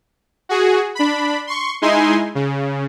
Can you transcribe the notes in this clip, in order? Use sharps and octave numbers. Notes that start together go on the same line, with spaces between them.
F#4 G#4
D4 B5
C6 C#6
G#3 D#4 E4 G#5 C6
C#3